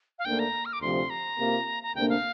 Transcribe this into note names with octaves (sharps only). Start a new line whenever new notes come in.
F5
D2 D3 A#3 D4 G5
A#5
F6
D6
D2 C3 F3 C6
A#5
C3 A#3 F4
A#5
D2 C3 A#3 D4 G5
F5